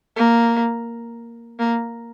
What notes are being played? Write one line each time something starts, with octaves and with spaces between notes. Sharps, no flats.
A#3
A#3